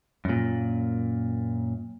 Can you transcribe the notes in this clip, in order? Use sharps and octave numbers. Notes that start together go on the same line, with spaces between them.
F#2 A#2